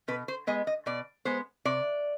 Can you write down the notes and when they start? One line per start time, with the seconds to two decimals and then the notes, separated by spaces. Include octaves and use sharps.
0.08 B2 B4
0.28 C5
0.47 G#3 B3 D#5
0.67 D#5
0.86 B2 D5
1.25 G#3 B3 C5
1.65 C3 D5